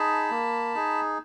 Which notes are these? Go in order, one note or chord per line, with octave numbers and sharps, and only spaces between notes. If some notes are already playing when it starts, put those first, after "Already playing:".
Already playing: D#4 G#4 A5 B5
A#3
D#4 G#4